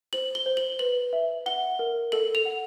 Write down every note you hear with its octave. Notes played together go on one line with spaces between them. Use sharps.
C5 F#7
G7
C5
F#7
B4 F#7
E5
F#5 G7
A#4
A4 F#7
F7
F#5